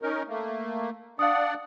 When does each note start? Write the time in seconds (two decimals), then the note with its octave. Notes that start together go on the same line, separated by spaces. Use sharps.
0.02 C#4 D#4 A#4
0.29 A3 A#3
1.19 D4 D5 F5 F#5 D#6